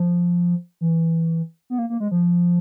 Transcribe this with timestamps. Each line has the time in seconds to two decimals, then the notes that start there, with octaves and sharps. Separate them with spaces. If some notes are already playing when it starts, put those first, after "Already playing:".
Already playing: F3
0.81 E3
1.70 B3
1.79 A#3
1.90 A#3
2.00 G#3
2.11 F3